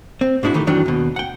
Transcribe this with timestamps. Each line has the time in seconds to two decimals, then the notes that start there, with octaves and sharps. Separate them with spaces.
0.21 C4
0.43 G#2 G#3 D4 E4 F#4
0.54 D#3 E3 A3 G4
0.67 F2 D#3 E3 F#3 D4
0.86 D#2 B2
1.16 F#5 G5